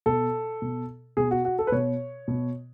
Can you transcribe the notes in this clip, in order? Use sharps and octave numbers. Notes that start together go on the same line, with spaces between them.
B2 A4
B2
B2 G#4
F#4
F#4
A4
B4
B2 C#5
B2